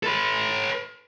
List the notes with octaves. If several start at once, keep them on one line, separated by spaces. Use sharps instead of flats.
A4 B4